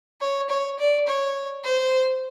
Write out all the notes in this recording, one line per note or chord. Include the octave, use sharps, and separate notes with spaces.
C#5
C#5
D5
C#5
C5